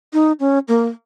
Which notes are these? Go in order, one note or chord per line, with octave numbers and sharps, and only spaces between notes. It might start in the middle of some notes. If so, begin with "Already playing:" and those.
D#4
C#4
A#3